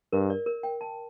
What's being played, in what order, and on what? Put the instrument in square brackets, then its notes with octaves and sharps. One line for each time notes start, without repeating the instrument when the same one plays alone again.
[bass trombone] G2 [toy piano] A#4
[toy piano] D5
A#4
G5
A5